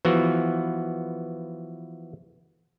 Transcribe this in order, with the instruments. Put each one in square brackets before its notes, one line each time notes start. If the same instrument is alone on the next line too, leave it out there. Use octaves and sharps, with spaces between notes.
[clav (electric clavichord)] E3 F3 B3 F#4